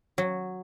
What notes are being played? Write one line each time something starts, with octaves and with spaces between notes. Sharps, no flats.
F#3